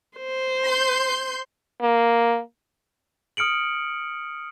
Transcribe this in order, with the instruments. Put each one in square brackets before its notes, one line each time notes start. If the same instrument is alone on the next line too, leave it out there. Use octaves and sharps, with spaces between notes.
[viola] C5
[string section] C6 G6
[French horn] A#3
[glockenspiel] D#6 F6 C#7 D7 F#7